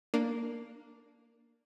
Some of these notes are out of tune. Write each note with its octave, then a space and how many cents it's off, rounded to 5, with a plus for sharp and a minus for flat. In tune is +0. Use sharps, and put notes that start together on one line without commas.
A#3 +0 D4 +0